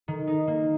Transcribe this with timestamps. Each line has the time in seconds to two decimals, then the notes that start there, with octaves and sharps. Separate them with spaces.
0.08 D#3
0.27 D#4
0.47 A#3